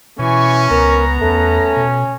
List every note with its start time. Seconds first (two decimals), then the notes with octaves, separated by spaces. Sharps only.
0.19 B2 E3 C#4 G#5 C#6
0.71 C#2 B3 A#4 A#5
1.21 E2 A3 C#4
1.77 B2